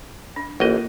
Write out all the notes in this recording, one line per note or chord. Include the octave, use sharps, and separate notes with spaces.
D4
A1 A#3 F4 A#4 D#5